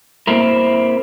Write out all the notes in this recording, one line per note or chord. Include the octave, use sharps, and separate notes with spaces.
A#3 C4 E4 A#4